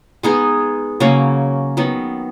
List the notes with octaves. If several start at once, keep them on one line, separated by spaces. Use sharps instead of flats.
G#3 B3 D#4 G#4
C#3 F#3 A#3 C#4
D#3 F#3 B3